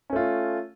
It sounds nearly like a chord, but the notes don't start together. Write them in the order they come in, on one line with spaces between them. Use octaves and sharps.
C#4 A3 F4